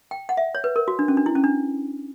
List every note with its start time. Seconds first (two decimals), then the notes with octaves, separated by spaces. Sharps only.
0.11 G5
0.29 F#5
0.37 E5
0.55 C#5
0.64 B4
0.76 A#4
0.88 F#4
0.99 D4
1.08 C#4
1.17 D4
1.26 E4
1.35 C#4
1.44 D4